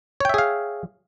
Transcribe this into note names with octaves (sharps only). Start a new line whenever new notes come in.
G#4 C#5 E5 F5 G5